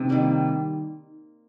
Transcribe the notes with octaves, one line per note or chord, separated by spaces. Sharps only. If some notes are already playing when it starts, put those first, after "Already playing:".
Already playing: C3 C4 D#4
D#3 G3 A#3